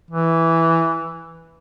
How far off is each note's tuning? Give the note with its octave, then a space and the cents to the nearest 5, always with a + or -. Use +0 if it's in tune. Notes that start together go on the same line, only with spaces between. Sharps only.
E3 +0